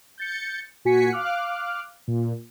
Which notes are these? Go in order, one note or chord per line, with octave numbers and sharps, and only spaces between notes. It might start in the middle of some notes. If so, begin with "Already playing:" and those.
G6 A6 C#7
A#2 F#4 G#5 B6 C#7
F5 D6 F6 F#6
A#2